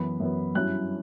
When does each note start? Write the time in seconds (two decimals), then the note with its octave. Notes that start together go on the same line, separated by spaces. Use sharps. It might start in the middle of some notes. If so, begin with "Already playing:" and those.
Already playing: F#2 E3 B3 B5
0.20 F#2 E3 B3
0.54 G2 F#3 C#4 E4 F#6